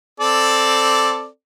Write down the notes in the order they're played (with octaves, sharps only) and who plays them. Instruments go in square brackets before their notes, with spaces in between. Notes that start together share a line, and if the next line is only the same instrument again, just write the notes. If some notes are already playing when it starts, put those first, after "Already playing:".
[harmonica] C4 A4 D5